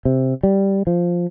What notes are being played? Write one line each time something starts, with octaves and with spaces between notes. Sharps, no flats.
C3
G3
F3